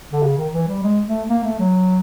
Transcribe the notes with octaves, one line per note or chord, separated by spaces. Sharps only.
D3
C#3
D#3
E3
G3
G#3
A3
A#3
A3
F#3